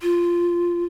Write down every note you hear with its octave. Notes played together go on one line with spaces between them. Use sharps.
F4